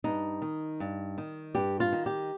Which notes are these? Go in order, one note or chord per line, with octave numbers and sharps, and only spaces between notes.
G2 D#4
D#3
G2
D#3
G2 G4
F4
D#3
G4